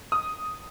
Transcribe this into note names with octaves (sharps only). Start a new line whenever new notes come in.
D#6